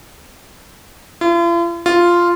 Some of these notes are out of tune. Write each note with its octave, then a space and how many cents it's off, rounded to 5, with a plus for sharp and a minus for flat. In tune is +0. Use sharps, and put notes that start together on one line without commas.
F4 -45
F4 -5